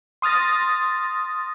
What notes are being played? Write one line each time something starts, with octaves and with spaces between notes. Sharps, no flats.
C6 D#6 F6 A6 A#6